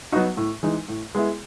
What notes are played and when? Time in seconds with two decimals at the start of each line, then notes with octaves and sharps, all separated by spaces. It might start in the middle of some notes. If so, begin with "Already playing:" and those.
0.12 F#3 B3 D#4 F#4
0.37 A2
0.63 E3 G#3 D#4
0.88 A2
1.15 G#3 B3 E4 G#4